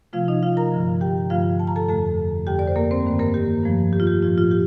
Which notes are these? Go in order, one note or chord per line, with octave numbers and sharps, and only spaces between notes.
C3 F3 A3 F4 F5
D#4 D#5
F4 F5
A#4 A#5
G2 D3 F3
G4 G5
G2 D3 F3 A3 F4 F5
A5
A#5
A4 A5
F2 D3 A3 A4 A5
F2 D3 G3 G4 G5
D5
C5
A#3 A#4
C4 C5
G2 D#3 A3
A#3 A#4
G4
G2 F3 A3
G4
F4
G4
A2 F3 A3 F4
F4
G4